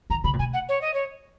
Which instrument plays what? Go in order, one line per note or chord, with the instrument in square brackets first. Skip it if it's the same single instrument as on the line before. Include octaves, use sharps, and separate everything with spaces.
[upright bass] D#3 [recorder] A#5
[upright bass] C#3 [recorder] B5
[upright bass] A#2
[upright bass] B2 [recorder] G#5
[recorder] F#5
C#5
D#5
C#5